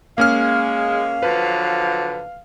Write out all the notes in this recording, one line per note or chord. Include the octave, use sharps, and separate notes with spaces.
G#3 A#3 C#4 F5 F6
D3 F3 F#3 B4